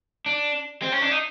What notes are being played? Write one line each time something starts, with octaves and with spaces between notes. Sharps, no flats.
D4
C4
C#4
D4
D#4